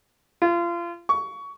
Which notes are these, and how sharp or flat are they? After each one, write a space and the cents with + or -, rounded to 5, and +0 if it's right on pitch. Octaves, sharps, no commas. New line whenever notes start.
F4 -30
C#6 +20